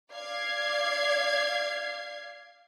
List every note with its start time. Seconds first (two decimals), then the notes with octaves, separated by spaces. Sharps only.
0.12 D5 F5 G#6 C7